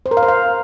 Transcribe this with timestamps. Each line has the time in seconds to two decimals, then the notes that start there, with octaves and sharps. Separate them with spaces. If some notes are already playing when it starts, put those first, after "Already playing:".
0.06 C5
0.11 A#4
0.17 F5
0.23 C5
0.28 F5